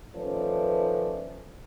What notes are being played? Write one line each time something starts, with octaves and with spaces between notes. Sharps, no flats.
D#3 F3 A3 C#4 B4 D5